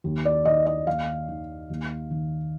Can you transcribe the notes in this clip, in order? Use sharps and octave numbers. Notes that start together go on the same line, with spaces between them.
D#2
D5
D#3 D#5
D#5
D#2 F5
D#3
D#2
D#3